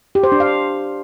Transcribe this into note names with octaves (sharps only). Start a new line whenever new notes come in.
G4
C5
D4
F5